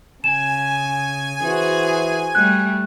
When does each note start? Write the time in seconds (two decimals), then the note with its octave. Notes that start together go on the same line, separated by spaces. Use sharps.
0.24 C#3 G#5 E7
1.42 E3 F#4 G#4 C5
2.35 G3 A3 F#6